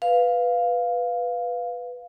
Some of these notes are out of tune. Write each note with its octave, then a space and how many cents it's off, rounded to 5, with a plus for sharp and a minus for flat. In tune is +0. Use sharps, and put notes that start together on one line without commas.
B4 +0 F5 +0